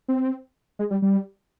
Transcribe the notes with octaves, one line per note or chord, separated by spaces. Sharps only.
C4
G#3
G3
G3